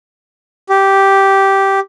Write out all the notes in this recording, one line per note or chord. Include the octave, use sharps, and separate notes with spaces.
G4